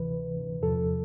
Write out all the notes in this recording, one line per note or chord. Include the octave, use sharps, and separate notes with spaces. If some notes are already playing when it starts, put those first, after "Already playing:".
Already playing: D2 C3 E3 B4
E2 C3 F3 A4